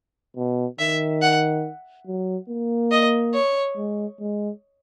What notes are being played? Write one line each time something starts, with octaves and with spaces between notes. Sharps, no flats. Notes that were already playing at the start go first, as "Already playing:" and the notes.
B2
D#3 E5
F#5
F#3
A#3
D#5
C#5
G#3
G#3